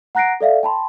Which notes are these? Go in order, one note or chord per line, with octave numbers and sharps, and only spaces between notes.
F#5 A#5 F#6 A#6 C7 D7
A4 D5 E5 F5
G5 A5 B5 C6